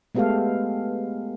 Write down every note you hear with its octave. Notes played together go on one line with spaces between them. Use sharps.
G#3 A3 B3 G4 A4 F5